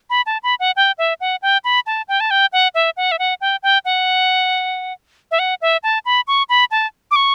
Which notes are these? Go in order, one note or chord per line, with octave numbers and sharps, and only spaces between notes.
B5
A5
B5
F#5
G5
E5
F#5
G5
B5
A5
G5
A5
G5
F#5
E5
F#5
E5
F#5
G5
G5
F#5
E5
F#5
E5
A5
B5
C#6
B5
A5
D6
C#6